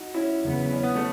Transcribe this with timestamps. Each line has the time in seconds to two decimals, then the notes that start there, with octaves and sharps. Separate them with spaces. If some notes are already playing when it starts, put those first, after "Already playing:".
Already playing: D#4 F#4
0.14 C#4 E4
0.43 E2 C#3 F#3 B3
0.72 C#4
0.83 B3
0.96 A3 C#4